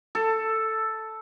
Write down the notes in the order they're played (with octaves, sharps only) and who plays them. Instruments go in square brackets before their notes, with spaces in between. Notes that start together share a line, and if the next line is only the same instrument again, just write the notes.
[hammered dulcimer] A4